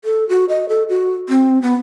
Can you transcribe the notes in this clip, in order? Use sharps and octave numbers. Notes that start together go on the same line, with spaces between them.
A4
F#4
D#5
A4
F#4
C4
B3